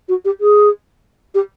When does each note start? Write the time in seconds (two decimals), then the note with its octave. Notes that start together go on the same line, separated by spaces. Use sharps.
0.08 F#4
0.25 G4
0.40 G#4
1.34 G4